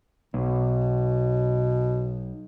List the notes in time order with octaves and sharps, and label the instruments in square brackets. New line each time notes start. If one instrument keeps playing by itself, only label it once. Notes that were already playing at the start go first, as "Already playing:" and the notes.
[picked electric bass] B1 [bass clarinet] B2